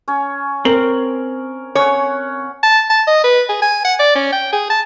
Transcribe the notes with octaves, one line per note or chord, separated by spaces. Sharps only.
C#4 C#5
C4 A#4 F#7
C#4 C#5 F#5
A5
A5
D#5
B4
G#4
G#5
F#5
D5
C#4
G5
G#4
A5